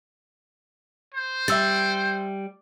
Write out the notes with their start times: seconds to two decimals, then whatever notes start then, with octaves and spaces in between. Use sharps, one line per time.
1.15 C5
1.48 G3 E5 E6 A6